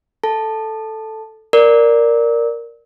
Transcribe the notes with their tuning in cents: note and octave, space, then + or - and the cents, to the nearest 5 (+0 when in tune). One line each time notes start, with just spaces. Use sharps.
A4 +0 A5 +0
A#4 +0 D5 +0